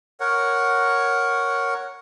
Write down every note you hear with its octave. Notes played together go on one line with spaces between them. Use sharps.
A#4 C#5 F#5